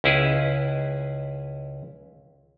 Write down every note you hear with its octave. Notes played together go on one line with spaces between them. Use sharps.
C#2 C#4 E4 G#4 B4